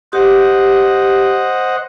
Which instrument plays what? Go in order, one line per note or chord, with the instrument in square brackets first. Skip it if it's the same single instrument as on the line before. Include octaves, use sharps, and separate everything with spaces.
[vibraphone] G4 [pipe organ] C5 D#5 F#5